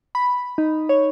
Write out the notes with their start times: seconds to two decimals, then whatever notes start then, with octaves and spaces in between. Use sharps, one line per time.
0.15 B5
0.58 D#4
0.89 C#5